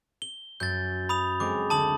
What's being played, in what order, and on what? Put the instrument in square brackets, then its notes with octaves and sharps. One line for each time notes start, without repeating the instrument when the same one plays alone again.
[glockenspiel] G7
[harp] F#2 [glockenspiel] G6 A6
[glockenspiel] B5 D#6 F7
[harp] G#3 C4 [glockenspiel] D6
[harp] D2 [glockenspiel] A5 D#6 F#7